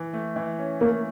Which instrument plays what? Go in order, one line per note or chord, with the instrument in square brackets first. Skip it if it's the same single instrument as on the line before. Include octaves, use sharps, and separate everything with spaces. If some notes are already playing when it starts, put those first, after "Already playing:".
Already playing: [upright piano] E3
A3
E3
C#4
[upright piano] A3 [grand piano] A#3